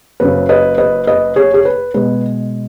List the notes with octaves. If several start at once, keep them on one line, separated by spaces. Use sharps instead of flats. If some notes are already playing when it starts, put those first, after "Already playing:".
F#1 F#2 C#3 B4
B4 D#5
B4 D#5
B4 D#5
G#4 C#5
G#4
B4
B2 G#3 B4